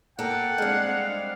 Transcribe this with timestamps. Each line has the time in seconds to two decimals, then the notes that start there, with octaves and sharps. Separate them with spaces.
0.19 A#3 A4 F#5 G5
0.58 G3 G#3 C4 D4 F5